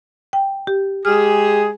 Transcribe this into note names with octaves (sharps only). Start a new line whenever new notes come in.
G5
G4
G#3 G4 G#4 F6